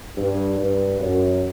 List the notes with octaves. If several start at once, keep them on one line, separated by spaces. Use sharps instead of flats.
G2
G2
F#2